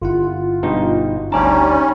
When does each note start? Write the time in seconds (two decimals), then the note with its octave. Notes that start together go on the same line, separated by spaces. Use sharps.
0.02 G1 E4 F4 F#5
0.63 G2 B2 D#4
1.32 D2 G3 C#4 D#4 D5 A5 A#5